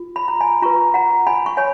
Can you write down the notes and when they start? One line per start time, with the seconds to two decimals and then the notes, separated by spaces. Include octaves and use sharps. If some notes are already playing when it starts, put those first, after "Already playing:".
Already playing: F4
0.16 B5
0.28 A#5
0.41 G#5 B5
0.62 F4 B4 A#5 C#6
0.94 F#5 A#5
1.27 G#5 B5
1.46 C#6
1.57 C#5 G#5 B5